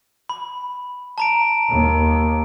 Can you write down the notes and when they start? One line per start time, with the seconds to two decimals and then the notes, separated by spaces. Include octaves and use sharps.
0.29 B5
1.18 A5 A#5 D7
1.69 D#2